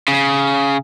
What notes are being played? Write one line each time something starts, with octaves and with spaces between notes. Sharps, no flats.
C#3